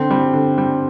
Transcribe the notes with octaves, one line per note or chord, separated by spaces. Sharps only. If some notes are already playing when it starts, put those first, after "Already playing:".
Already playing: D3 C4
G3
D3
G3